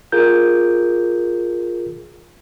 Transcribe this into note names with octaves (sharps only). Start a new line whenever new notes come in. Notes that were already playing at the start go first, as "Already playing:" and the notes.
F4 G#4 A#4 G6